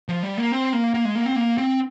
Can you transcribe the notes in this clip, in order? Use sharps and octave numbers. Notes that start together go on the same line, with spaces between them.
F3
G3
A#3
C4
A#3
A#3
G#3
A#3
C4
A#3
C4